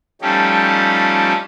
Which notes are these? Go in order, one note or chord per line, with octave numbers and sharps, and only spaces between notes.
F3 G3 A3 C#4 D#4 G4